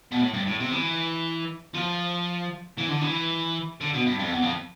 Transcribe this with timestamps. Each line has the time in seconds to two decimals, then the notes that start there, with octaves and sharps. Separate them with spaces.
0.11 B2
0.21 A2
0.34 G2
0.47 A2
0.60 C3
0.72 E3
1.75 F3
2.78 E3
2.89 D3
3.01 E3
3.81 D3
3.93 B2
4.06 G2
4.19 F2
4.31 E2
4.42 F2